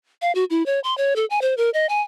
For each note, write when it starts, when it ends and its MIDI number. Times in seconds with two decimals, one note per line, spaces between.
0.22 0.32 77
0.35 0.44 66
0.50 0.65 64
0.66 0.80 73
0.84 0.96 84
0.98 1.16 73
1.16 1.25 69
1.30 1.41 80
1.42 1.54 72
1.57 1.70 70
1.74 1.86 75
1.89 2.02 80